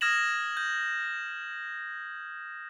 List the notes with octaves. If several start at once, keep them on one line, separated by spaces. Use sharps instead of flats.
D#6 F6 G#6 A#6 E7 F#7
G6